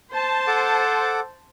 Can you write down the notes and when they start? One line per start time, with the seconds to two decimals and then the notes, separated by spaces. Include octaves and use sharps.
0.11 C5 A5
0.47 A4 F#5 D6